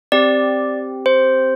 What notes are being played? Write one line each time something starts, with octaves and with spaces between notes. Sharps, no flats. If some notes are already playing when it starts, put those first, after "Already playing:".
C4 G4 D5
C5